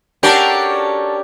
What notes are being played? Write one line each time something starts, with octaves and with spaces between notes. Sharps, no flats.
C#4 D4 F#4 G4 A4 A#4 G5